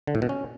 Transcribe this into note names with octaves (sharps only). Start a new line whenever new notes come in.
D3
A2
B2
C#4